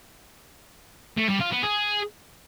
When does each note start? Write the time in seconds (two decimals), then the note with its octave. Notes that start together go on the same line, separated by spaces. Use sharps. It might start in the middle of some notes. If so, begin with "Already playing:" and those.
1.17 A3
1.29 G3
1.40 F4
1.51 B3
1.63 G#4